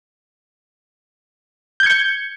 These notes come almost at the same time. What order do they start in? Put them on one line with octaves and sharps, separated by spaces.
G6 G#6 C#7